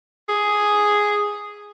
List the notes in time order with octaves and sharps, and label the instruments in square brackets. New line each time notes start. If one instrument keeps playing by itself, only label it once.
[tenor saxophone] G#4